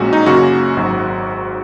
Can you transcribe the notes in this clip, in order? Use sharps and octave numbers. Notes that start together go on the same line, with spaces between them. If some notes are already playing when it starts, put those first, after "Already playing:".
Already playing: A#1 A#2 G#3 C#4 F#4
D#4
F#2 C#3 A#3 C#4 F#4
G#1 G#2 F#3